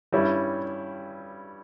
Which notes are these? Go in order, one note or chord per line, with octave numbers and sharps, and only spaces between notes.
G2 G3 C#4 E4